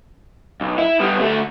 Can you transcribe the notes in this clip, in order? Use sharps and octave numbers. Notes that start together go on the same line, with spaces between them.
B1
E4
G3 B3
D2 A3